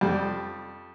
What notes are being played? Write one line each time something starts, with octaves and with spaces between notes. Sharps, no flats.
F2 G3